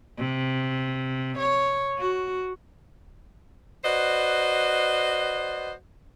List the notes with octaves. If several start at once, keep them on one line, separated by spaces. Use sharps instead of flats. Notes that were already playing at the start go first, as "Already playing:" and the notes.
C3
C#5
F#4
F#4 B4 C5 D5 D#5